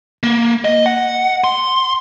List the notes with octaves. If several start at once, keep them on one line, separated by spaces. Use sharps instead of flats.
A#3
D#5
F#5
C6